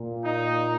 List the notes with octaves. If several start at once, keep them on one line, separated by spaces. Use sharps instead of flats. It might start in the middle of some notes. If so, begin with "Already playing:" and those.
Already playing: A#2
D#4